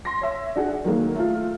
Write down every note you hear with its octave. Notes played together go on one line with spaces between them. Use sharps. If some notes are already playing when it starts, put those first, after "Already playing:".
C6 A#6
C#5 E5
D4 F#4 G#4
D#3 F#3 G#3 A#3
A3 F4